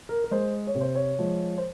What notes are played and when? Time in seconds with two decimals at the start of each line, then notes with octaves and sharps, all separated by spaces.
0.09 A#4
0.24 A#4
0.31 G#3 C5
0.67 C#5
0.75 C3
0.81 C5
0.95 C#5
1.19 F3 G#3
1.58 C5